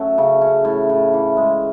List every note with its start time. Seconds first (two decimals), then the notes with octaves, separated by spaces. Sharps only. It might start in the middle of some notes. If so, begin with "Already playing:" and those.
Already playing: F#3 A3 C#4
0.18 C#3
0.41 C#4
0.65 A2
0.89 A2
1.14 E3
1.37 G#3